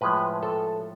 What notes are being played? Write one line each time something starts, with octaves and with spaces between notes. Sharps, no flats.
A2 F3 G#3 B4
A4